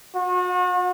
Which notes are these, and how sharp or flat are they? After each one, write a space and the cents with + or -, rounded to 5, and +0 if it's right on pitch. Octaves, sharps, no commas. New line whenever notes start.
F#4 -40